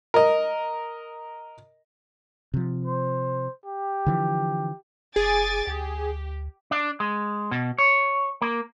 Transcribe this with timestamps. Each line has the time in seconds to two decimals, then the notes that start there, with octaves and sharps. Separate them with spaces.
0.14 A#4 D#5
2.54 C3 F3
2.85 C5
3.66 G4
4.06 D3 E3 F3
5.16 F#1 G#4 G#5 D6 A6
5.67 D2 G4
6.71 D4
7.00 G#3
7.51 B2
7.78 C#5
8.42 A#3